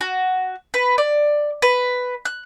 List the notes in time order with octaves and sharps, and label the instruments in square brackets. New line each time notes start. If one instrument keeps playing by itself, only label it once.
[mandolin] F#4
B4
D5
B4
F#6